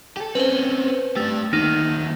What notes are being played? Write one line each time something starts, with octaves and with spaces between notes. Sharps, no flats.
G4 A4
C4 C#4 B4 C5
A3 D4 G4
D2 D#3 A#3 D#4